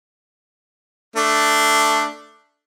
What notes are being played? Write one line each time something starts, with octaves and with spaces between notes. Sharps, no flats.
A3 D4